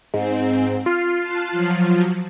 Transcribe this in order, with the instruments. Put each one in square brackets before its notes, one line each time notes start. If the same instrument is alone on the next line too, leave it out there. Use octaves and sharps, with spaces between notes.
[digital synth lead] G#2 [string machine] C4
[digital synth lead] F4 [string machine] C7
[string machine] A5 F#6 C7
F3 F#3